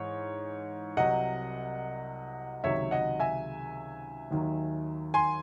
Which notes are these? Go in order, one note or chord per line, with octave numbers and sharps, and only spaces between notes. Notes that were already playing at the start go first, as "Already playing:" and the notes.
Already playing: G#2 E3 C#5
C2 C3 F#3 D#5 F#5
C#2 C3 D#3 F#3 C#5 E5
D#5 F#5
E5 G#5
D#2 D#3 F#3
G#5 C6